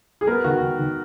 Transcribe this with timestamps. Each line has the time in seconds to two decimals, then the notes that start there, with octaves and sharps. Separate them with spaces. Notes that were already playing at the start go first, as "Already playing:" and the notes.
0.21 G#4
0.27 B3 A#4
0.44 D#3 F#4
0.61 D#3
0.79 D#3